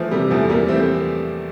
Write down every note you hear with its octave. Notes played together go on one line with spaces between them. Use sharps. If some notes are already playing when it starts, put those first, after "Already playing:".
Already playing: E3 F3 A3
C3 G3
E2 F3 A3
E2 G3 A#3
E3 A3 C4